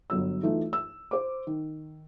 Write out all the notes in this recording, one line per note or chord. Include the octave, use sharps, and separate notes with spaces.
G1 F#3 E6
E3 A3 D#4 F4
E6
C5 D6
D#3